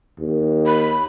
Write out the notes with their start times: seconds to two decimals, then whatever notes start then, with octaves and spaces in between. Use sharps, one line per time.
0.20 D#2
0.66 B5